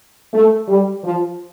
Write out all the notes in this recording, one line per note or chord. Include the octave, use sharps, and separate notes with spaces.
A3
G3
F3